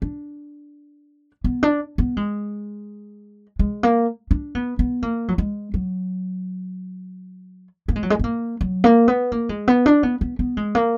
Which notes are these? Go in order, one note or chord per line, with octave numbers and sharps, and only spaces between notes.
D4
B3
D4
B3
G#3
G#3
A#3
D4
B3
B3
A#3
F#3
G#3
F#3
A#3
G#3
F#3
G#3
B3
A#3
F#3
A#3
B3
A#3
G#3
B3
D4
B3
B3
B3
G#3
A#3